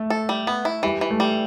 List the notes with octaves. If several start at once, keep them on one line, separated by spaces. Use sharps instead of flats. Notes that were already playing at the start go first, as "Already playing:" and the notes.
Already playing: A3
A4
G3
B3
E4
E3 G3
E3
A3
G3